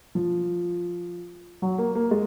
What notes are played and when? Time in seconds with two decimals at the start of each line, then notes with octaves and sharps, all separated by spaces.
0.15 F3
1.62 F#3
1.78 A#3
1.95 A#3
2.11 G#3